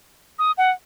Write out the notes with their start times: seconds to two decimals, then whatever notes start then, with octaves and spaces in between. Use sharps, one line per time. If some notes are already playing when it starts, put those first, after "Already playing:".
0.39 D#6
0.58 F#5